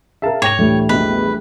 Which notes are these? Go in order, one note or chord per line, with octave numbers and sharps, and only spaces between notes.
G#4 A#4 E5 F5 A5
G#2 C#5 G5 A#6 F7
C#2 A2 E3 G3 A3 D4
A#1 E2 F#4 B4 D#5